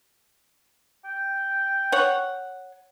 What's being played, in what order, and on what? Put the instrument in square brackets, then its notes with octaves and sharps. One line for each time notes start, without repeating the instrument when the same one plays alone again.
[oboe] G5
[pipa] C#5 F#5